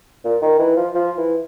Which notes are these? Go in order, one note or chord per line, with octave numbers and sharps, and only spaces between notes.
A#2
D#3
E3
F3
F3
E3